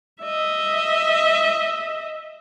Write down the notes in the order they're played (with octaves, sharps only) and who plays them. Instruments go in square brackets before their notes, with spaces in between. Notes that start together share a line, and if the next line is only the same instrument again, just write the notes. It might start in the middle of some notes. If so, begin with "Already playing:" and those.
[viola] D#5 E5